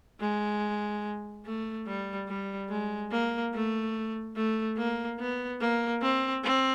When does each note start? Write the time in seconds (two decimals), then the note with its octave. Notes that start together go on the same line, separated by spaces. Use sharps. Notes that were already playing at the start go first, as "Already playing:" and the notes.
0.20 G#3
1.45 A3
1.87 G3
2.28 G3
2.70 G#3
3.11 A#3
3.53 A3
4.36 A3
4.77 A#3
5.19 B3
5.60 A#3
6.02 C4
6.44 C4